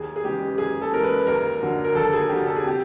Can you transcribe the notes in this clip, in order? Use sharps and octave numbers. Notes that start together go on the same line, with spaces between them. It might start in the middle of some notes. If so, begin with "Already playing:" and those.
Already playing: D#2 G#4
G#4
C#3 E3 G#3 G4
D#2 G#4
A4
C#3 E3 G#3 A#4
B4
D#2 A#4
D3 F#3
A#4
D#2 A4
G#4
D3 F#3 G4
A4
G#4
C3 G4